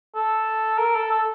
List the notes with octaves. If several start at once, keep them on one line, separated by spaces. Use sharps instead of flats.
A4
A#4
A4
A4